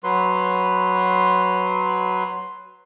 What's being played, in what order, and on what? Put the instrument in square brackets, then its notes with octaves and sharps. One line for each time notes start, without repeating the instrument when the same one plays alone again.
[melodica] F#3 B4 C6